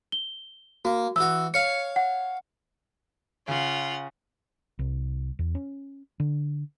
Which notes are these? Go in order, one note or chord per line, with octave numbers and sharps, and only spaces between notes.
G7
A#3 F#4
E3 F#4 E6
C#5 F5 C#7
F#5
C#3 F4 F#5
C2
E2
C#4
D3